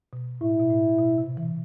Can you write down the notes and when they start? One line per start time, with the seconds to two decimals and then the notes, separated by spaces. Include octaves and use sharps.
0.13 B2
0.41 A2 E4
0.59 B2
0.70 A2
0.99 B2
1.18 C3
1.37 E3